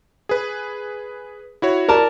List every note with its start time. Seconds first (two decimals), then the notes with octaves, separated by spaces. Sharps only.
0.29 G#4 B4
1.62 E4 F#4 C#5
1.89 A#4 D5 A5